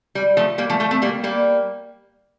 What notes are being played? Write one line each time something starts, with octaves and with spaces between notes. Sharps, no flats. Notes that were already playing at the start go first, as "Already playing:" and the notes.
G3
F3 A3
G3 A#3
F3 A3
F3 A3
A3 C4
G3 A#3
G3 A#3